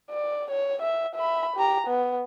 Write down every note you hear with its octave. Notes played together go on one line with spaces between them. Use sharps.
D5
C#5
E5
E5 B5
G4 A#5
B3